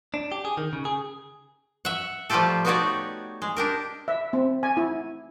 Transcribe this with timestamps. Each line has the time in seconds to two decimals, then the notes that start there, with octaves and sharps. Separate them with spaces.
0.14 D4
0.32 G4
0.45 G#4
0.57 D#3
0.73 C#3
0.85 G#4
1.85 E5 F#5
2.30 F3 G3 A3 F4 G4 A4
2.65 B3 D#4 F#4 G4 C#5 D5
3.42 G#3
3.57 D4 G4 A#4
4.08 E5
4.33 C4
4.63 G#5
4.77 E4